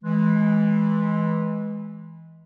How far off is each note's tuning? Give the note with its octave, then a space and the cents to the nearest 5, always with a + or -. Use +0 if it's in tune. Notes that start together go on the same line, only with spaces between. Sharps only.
E3 -10 G#3 +15